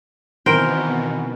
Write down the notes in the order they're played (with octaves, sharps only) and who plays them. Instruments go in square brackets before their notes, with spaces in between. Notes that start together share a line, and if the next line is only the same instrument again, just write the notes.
[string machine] B2 [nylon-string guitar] D#3 E3 C4 [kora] A#4 C5 G5